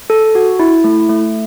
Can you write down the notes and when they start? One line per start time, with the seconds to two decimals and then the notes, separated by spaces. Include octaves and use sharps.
0.10 A4
0.35 F#4
0.59 E4
0.84 A3
1.09 A3